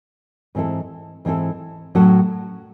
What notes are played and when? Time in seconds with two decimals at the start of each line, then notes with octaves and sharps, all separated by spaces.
0.55 G#2 E3 C4 E4 A4
1.25 G#2 E3 C4 E4 A4
1.95 A2 F#3 C#4 F#4 A4